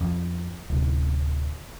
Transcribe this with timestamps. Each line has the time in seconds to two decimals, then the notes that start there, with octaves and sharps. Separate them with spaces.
0.01 F2
0.70 D1 C3